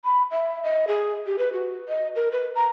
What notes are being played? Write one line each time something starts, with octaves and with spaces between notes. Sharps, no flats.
B5
E5
D#5
G#4
G4
B4
F#4
D#5
A#4
B4
A#5